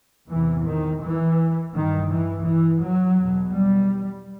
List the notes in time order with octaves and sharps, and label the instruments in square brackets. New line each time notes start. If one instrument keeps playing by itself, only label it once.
[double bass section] E2 C3 E3
D#3
E3
G2 D#3
E3
E3
F#3
E2 B2
G3